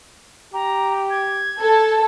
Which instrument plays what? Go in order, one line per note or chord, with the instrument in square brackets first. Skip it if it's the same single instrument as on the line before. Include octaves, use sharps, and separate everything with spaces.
[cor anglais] G4 [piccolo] A#5
[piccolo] G#6
[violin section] A4